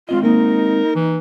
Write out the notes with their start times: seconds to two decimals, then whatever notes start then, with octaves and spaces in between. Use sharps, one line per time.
0.09 G#3 C4 F4 D#5
0.23 A#3 D#4 A#4
0.95 E3